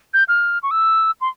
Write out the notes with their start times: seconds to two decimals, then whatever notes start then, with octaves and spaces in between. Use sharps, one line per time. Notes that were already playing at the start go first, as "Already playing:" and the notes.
0.14 G6
0.28 F6
0.63 C#6
0.71 E6
1.21 C6